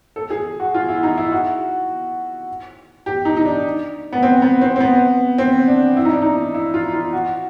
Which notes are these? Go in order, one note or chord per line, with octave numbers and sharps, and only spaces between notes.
A4
G#4
F#4
F4
E4
D#4
E4
F#4
G4
D#4
D#4
D4
B3
C4
B3
C4
C4
B3
C4
D4
E4
D#4
D4
D#4
E4
F4
F4
F#4